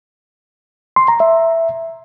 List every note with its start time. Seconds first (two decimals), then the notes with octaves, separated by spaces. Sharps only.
0.96 C6
1.08 A#5
1.20 E5